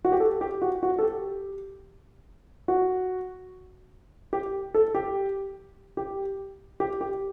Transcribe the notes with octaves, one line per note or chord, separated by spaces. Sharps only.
F#4
G4
A4
G4
F#4
F#4
A4
G4
F#4
G4
A4
G4
G4
G4
G4